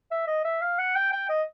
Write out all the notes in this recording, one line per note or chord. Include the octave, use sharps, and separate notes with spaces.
E5
D#5
E5
F5
F#5
G5
G5
D#5